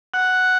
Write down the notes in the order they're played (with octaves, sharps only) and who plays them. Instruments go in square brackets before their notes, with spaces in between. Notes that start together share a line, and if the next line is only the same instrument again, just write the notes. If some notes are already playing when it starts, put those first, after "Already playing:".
[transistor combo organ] F#5